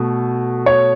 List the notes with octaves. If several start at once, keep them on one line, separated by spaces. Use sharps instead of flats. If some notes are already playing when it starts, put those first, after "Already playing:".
Already playing: B2 A3
C#5